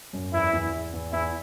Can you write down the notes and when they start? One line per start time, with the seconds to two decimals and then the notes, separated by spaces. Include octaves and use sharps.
0.13 F#2
0.33 E2 E4
0.53 E2
0.73 E2
0.93 E2
1.12 E2 E4